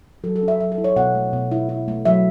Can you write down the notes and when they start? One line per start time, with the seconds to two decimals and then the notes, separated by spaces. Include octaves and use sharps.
0.24 F#3 A4
0.36 A4
0.43 C#4
0.48 E5
0.60 F#3 E5
0.72 A4
0.78 E4
0.84 C#5
0.96 B2 F#5
1.15 A3
1.33 B2
1.51 E4
1.69 E4
1.88 A3
2.05 F#3 E5